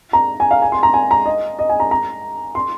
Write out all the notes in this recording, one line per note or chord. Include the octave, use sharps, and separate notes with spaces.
A#5
G#5
F5
G#5
C6
A#5
G#5
A#5
D#5
D#5
G#5
A#5
A#5
C6